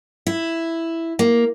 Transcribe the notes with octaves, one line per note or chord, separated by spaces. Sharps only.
E4
A#3